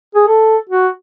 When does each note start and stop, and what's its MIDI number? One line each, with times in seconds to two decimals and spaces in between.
0.15 0.25 68
0.28 0.57 69
0.69 0.88 66